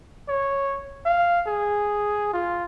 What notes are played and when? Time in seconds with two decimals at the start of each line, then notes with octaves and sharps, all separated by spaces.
0.28 C#5
1.06 F5
1.47 G#4
2.33 F4